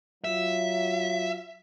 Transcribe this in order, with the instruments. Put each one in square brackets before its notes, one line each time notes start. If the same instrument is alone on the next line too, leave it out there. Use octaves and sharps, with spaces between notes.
[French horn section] F#3 F4 [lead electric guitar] E5